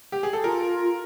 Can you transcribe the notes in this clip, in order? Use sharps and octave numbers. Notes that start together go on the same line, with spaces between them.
G4
G#4
A4
F4 A#4